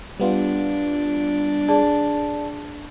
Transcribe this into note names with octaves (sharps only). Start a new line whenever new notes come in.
G3 B3 D4 F4
G#4 D5 A5